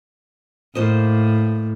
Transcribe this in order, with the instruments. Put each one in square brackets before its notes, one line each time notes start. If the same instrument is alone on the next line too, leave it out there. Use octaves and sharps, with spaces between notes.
[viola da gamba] A2 [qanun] A#3 C5 D#5